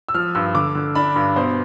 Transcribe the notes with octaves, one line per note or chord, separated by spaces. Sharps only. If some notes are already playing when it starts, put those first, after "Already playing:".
E6
F3 F6
G2 E6
D3 D6
D3
D4 B5
G2
B2 C5